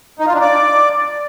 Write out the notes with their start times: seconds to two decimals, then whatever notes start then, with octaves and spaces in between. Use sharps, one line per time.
0.19 D#4
0.27 F4
0.34 D4
0.41 D5